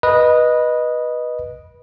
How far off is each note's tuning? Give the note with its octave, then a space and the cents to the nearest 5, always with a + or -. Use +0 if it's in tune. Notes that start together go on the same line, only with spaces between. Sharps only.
B4 -15 D#5 -5